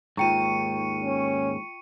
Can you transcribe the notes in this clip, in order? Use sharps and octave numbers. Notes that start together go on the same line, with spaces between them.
D#2 G#2 F4 G5 A#5 C#6 C#7 D#7
C#4